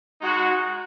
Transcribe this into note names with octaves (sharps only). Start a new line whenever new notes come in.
G#3 D#4 F#4